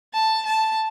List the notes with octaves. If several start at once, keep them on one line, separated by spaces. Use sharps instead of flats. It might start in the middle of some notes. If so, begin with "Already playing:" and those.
A5
A5